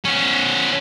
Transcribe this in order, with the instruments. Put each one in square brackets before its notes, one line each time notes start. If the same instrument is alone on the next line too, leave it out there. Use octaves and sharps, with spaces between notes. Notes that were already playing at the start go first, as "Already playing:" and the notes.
[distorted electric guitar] B3 C#4